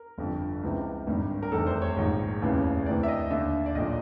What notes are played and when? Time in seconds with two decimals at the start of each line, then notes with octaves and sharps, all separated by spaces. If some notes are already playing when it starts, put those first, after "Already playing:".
Already playing: A#4
0.18 G1 F2 D3
0.63 C#2 C3 E3
1.07 G#1 G2 D#3
1.43 A#4
1.52 F1 E2 C3 D#3 A4
1.67 C5
1.82 C#5
1.96 A#1 G#2 D#3
2.41 F1 D#2 C#3 E3
2.86 D2 C3 E3 D5
3.03 E5
3.08 D#5
3.31 D#2 D3 E5
3.66 D5
3.75 B1 A#2 D#5